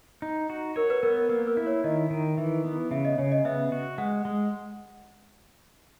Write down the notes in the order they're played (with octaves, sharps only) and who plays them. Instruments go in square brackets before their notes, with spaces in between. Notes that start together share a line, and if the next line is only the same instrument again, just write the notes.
[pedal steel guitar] D#4
F#4
[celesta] A#4 [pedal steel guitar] C#5
[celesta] B4
[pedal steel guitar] B3 [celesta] A#4
[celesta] A#4
[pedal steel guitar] A#3 [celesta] A#4
[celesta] A#4
[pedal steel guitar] E4
[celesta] C#5
[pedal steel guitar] D#3 [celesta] D#5
[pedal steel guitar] D#3
[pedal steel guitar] E3 [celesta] E5
[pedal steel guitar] B3
[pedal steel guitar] C#3 [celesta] E5
[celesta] D#5
[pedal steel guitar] C#3 [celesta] C#5
[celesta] D#5
[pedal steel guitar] B3 [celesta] E5
[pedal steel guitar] F#4
[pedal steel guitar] G#3 [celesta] F#5
[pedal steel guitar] G#3